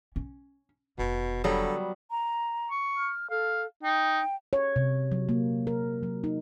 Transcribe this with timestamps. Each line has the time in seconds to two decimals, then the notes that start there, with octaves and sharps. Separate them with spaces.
0.16 C#4
0.98 F1 B2
1.44 D3 F#3 G3 B3
2.11 A#5
2.70 C#6
2.97 F6
3.30 A4 F5
3.83 D#4 G5
4.53 C#5
4.76 C3
5.12 F#3
5.29 A#3
5.67 A#4
6.03 F#3
6.24 D#4